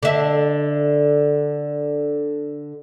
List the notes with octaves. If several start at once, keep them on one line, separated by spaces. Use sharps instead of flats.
D3 E5